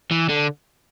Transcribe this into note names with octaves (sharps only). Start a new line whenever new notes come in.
E3
D3